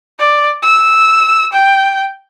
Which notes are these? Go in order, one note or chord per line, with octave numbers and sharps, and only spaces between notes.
D5
E6
G5